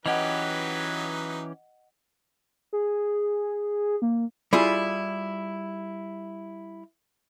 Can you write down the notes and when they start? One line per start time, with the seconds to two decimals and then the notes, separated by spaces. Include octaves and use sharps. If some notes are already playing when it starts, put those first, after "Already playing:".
0.06 E3 F#3 C#4 D#4 G4 B4 D#5 F#5
2.73 G#4
4.02 A#3
4.53 G3 E4 F4 G#4